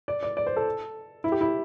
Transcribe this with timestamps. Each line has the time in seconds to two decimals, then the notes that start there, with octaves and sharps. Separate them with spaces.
0.08 D5
0.23 D5
0.37 D5
0.46 C5
0.57 A4
1.24 E4
1.32 G4
1.41 E4